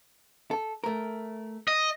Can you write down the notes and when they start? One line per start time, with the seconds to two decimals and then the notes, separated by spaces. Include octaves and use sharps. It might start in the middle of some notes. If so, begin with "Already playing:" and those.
0.51 A4
0.84 A3 A#4
1.68 D#5